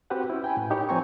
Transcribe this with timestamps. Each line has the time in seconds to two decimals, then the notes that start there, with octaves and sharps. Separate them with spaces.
0.10 C4 F#4 G4 B4 C5 F#5
0.30 C#4 E4
0.44 G5 G#5 B5
0.57 A2
0.71 D#4 G4 A#4 C#5
0.89 F3 C4 G#5 A#5 C#6